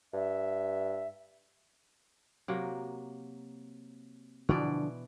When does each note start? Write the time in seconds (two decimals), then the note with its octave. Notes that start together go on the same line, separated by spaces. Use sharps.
0.13 G2 E5
2.48 C3 F#3 A#3
4.49 B2 D3 E3 F3 D4 D5